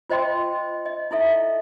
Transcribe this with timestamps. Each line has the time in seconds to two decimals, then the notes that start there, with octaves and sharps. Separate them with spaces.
0.10 F4 C5 D#5 G5 C6
0.86 D#5
1.11 D#4 E4 A4 E5